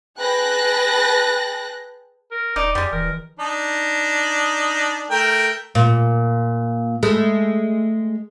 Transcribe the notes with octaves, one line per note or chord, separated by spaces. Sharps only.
G#4 B4 G5 A5 F#6 A#6
A#4
D#1 D#4 D5
F2 G3 G#3 G4
D#1 E3 A#4
D4 D#4
A3 A#4 G5
A#2
G#3 A3